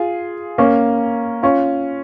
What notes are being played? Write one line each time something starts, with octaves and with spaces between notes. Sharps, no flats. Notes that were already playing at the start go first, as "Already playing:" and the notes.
Already playing: F4 G#4
A#3 C#4
C#4 F4